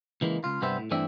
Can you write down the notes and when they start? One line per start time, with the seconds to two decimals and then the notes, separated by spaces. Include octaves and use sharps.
0.21 C#2 E3 G#3 A#3
0.44 C#2 F4
0.61 C2 G2 G3 B3 C5 E5
0.78 A2
0.91 G2 E3 A3 C4 D4 E5